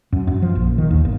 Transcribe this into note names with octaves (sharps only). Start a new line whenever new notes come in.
F#2
F#2
F3
A#1
D#3
D#2
G1